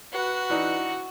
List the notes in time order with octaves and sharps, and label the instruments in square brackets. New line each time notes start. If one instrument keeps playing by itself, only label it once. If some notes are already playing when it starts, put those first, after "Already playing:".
[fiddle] F#4 [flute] B4
[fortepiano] E3 D4 D#4